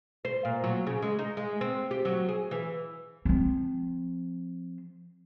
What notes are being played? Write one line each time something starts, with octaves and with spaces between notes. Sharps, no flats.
C5
A#2
F#3
C#3
G#3
D#4
G#3
C4
G4
F#3
G#4
E3
F3 C4